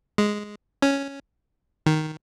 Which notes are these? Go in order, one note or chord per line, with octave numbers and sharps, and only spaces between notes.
G#3
C#4
D#3